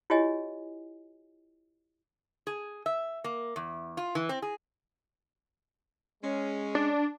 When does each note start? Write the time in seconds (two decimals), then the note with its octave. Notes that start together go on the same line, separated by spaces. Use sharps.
0.10 E4 F4 G4 C#5 D#5 G#5
2.47 G#4
2.86 E5
3.24 A#3
3.56 E2
3.97 F4
4.15 E3
4.29 C4
4.42 G#4
6.23 G#3 C#4
6.75 D4